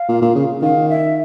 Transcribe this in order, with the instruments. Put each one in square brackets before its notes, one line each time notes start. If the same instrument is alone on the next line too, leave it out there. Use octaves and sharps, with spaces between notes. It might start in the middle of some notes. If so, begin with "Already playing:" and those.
Already playing: [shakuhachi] F5
[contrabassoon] A#2
A#2
C#3
[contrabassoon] D#3 [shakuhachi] F5
[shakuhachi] E5